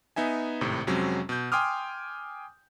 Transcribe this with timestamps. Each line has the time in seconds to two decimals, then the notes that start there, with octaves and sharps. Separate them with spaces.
0.16 B3 D#4 E5 G#5
0.61 G#1 A2 C3
0.87 F2 C3 F#3 G#3 C4 C#4
1.29 B2 G6
1.52 G5 G#5 C6 D6 D#6 F6